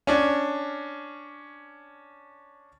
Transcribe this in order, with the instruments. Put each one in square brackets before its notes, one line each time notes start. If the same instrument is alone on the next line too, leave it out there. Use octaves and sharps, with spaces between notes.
[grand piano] C#4 D4